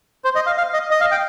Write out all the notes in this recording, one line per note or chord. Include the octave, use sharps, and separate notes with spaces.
C5
D#5
F5
F5
D#5
D#5
F5
G5